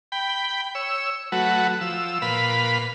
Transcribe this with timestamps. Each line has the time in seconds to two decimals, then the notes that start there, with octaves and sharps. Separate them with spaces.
0.12 G5 B5
0.75 C#5 E6
1.32 F#3 A3 F#4 B4
1.81 F3 E6
2.22 A#2 B4 F5 B5